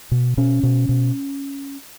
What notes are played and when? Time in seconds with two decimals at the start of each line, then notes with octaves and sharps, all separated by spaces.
0.11 B2
0.37 B2 C#4
0.63 B2
0.89 B2